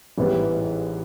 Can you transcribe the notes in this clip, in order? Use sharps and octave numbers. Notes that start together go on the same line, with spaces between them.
A1 G#2 E3 G3 B3